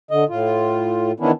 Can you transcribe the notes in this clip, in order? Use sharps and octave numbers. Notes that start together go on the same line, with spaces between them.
D3 D#5
A2 F4
D#3 E3 B3 C#4 D4 E4